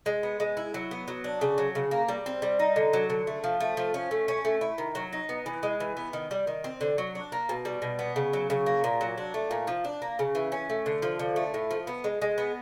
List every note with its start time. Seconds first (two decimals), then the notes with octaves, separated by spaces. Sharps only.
0.06 G#3
0.23 B3
0.40 G#3
0.57 E4
0.74 F#3
0.91 B3
1.08 F#3
1.24 D4
1.41 C#3
1.58 F#3
1.75 C#3
1.91 A#3
2.09 G3
2.26 C4
2.42 G3
2.60 D#4
2.76 D3
2.93 F#3
3.10 D3
3.27 A3
3.44 F3
3.60 A3
3.77 F3
3.94 C#4
4.11 A3
4.28 C#4
4.45 A3
4.61 E4
4.78 D#3
4.95 F#3
5.13 D#4
5.29 B3
5.46 E3
5.63 G#3
5.80 E3
5.97 B3
6.13 D#3
6.31 G3
6.47 D#3
6.64 C4
6.81 D3
6.98 F#3
7.15 D4
7.32 A#3
7.49 B2
7.65 G3
7.82 B2
7.99 B3
8.16 C#3
8.33 F#3
8.50 C#3
8.66 A#3
8.84 A#2
9.01 F#3
9.18 D4
9.34 A3
9.51 A#2
9.67 F3
9.85 D4
10.02 A#3
10.19 C#3
10.35 E3
10.52 C#4
10.69 A3
10.86 D3
11.02 F3
11.19 D3
11.36 A3
11.54 A2
11.71 F3
11.87 B3
12.04 G#3
12.22 G#3
12.38 B3